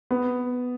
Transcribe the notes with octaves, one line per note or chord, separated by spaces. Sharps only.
B3